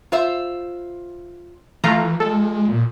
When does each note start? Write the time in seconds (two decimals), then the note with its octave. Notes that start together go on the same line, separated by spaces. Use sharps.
0.12 F4 C5 E5
1.84 E3 F3 A3 F4 A#5
2.20 G#3 A4
2.68 A#2